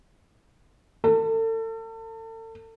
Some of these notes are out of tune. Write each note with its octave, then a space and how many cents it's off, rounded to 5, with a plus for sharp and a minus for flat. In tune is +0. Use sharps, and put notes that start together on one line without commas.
A4 +35